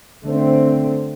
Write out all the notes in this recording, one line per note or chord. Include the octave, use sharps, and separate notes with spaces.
D3 A3 C4